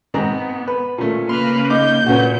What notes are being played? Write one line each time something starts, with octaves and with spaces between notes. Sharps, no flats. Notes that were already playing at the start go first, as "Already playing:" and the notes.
G#2 B3 C4 A#5
B4
A#2 A3 C#4
C#3 A#3 B4 C6 F6
D#4 D6 G6
A#2 B3 C#4 F#4